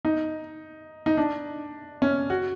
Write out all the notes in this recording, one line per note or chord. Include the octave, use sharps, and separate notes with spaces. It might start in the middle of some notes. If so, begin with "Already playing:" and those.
D#4
D#4
D4
C#4
F#4